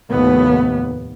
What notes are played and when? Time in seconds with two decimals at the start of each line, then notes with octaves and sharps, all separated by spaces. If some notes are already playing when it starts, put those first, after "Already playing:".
0.12 F1 D#2 A2 B3